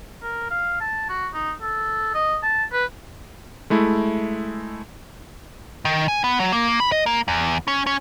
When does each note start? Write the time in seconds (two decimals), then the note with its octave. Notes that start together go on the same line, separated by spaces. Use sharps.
0.22 A#4
0.51 F5
0.81 A5
1.09 F#4
1.34 D#4
1.61 A4
2.14 D#5
2.43 A5
2.73 B4
3.70 G#3 A3 E4
5.85 D#3
6.08 G#5
6.24 B3
6.40 F#3
6.52 A#3
6.80 B5
6.92 D#5
7.06 A#3
7.28 E2
7.68 C#4
7.87 C#4